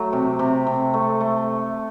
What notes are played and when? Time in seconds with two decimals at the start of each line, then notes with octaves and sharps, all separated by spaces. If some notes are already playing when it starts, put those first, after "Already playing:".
Already playing: F#3 A3
0.13 C3
0.39 C3
0.67 C3
0.94 A3
1.21 A3